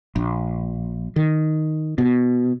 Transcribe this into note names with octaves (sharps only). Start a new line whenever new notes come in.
A#1
D#3
B2